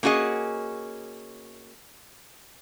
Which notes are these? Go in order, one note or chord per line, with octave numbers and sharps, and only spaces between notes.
A#3 C#4 F#4 G#4 D#5